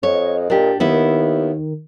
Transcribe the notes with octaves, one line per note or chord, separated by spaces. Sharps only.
F2 C#5 D#5
A#2 D4 G4
D#2 D#3 B3 E4